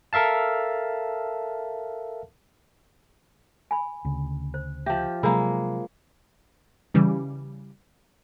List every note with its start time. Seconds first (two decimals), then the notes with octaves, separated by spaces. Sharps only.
0.13 A4 A#4 E5 F5 A5
3.71 G#5 B5
4.05 D2 C#3
4.54 C5
4.86 F3 G4 E5
5.23 C3 F#3 G#3 A#3 D4 A#4 B5
6.94 C#3 E3 G3